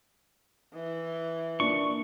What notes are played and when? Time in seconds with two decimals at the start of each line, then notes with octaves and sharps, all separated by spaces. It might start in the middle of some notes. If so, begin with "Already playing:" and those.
0.74 E3
1.60 A#3 D4 F4 C#6